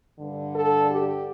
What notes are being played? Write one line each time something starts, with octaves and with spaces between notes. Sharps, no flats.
G2 D3
A4
G4